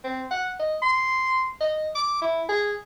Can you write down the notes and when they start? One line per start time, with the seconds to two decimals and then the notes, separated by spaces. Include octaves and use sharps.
0.04 C4
0.31 F#5
0.59 D#5
0.82 C6
1.60 D#5
1.95 D6
2.22 E4
2.49 G#4